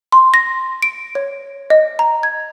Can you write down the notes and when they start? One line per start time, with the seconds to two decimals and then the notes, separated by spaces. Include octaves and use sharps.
0.12 C6
0.34 A#6
0.82 D7
1.15 C#5
1.70 D#5
1.99 A#5
2.23 G#6